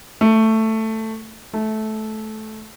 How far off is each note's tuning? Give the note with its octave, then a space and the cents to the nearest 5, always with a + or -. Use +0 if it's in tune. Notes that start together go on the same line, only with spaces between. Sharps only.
A3 +10
A3 -15